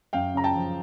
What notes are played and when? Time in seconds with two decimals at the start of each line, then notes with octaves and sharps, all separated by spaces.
0.13 F#2 F5 G5
0.34 C#3 A#5
0.44 G5 A5
0.55 F3